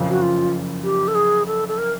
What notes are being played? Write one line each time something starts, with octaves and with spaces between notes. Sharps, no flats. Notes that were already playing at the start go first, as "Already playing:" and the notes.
Already playing: F#1 F2 C#3
F#4
F4
G4
A4
G#4
A4
A4
A#4